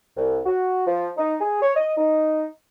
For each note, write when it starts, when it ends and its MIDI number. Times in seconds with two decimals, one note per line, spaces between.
0.16 0.40 36
0.46 0.86 66
0.87 1.09 53
1.17 1.36 63
1.41 1.61 68
1.62 1.76 73
1.76 1.92 75
1.97 2.45 63